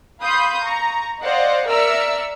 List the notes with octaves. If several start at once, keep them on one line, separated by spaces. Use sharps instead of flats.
F5 B5 C6 D#6 G6
A#5 C#6
C5 D5 D#5 F5 F#5
A#4 D5 E5 E6 F6 C#7